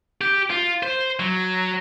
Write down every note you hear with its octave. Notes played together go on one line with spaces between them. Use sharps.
G4
F4
C5
F#3